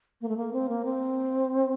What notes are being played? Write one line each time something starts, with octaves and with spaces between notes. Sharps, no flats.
A#3
A3
A#3
C4
A#3
C4